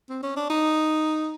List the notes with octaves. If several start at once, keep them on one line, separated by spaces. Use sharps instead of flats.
C4
C#4
D4
D#4